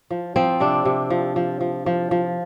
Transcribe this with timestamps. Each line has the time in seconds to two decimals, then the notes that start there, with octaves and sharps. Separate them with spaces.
0.10 F3
0.36 F3 C4
0.60 C3 D4
0.85 C3
1.10 F3
1.36 F3
1.61 F3
1.86 F3
2.11 F3